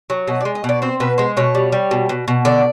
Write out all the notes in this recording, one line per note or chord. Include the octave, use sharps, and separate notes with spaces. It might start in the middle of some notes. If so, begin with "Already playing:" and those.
F#3
B2 D#5
D5
G#3
D#5
B2 D5
C4 C5
B2 B4
G#3 C5
B2 C#5
G3
G3
B2
B2
B2
D3 D5